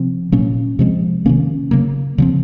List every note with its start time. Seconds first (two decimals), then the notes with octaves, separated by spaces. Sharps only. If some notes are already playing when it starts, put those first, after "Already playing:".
Already playing: C3 F3 C4
0.32 A#2 F#3 A#3 C#4
0.79 C3 F3 G#3 C4
1.26 C3 D#3 A#3 C#4
1.71 C#3 F#3 A#3
2.18 C#3 F3 C4